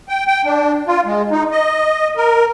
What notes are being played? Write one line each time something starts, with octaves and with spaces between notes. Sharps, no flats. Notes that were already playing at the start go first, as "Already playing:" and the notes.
G5
G5
D4
F4
G#3
D#4
D#5
A#4